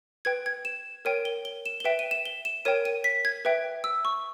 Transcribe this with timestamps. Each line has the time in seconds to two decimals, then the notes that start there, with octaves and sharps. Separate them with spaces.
0.25 B4 G5 G#6
0.46 G#6
0.65 E7
1.05 A#4 C#5 G5 D#7
1.25 G7
1.45 G7
1.66 E7
1.80 G7
1.84 B4 E5 G5 E7
1.99 D#7
2.11 E7
2.25 G7
2.45 E7
2.65 A#4 C#5 G5 D#7
2.85 D#7
3.04 B6
3.25 G#6
3.45 B4 E5 G5
3.84 E6
4.05 C#6